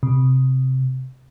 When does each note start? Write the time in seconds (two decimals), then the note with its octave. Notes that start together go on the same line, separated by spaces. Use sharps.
0.03 C3